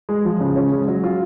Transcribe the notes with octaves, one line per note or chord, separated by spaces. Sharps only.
G#3
F3
C#3
C#4
G#3
F#3
F4